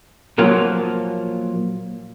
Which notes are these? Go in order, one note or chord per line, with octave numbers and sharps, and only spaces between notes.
A#2 F3 F#3 A#3 F4